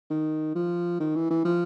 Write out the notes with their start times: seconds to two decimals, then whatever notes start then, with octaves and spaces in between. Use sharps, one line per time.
0.10 D#3
0.55 F3
1.00 D#3
1.15 E3
1.30 E3
1.45 F3